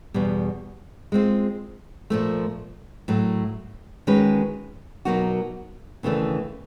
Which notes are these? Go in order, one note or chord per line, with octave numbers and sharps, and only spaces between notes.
E2 B2 G3
G#3 C4 F4
A#2 F3 A3
A2 F#3 A3
D#3 G#3 C#4 F#4 B4
B2 F#3 A#3 D#4 F#4
D#2 C#3 E3 A3 D4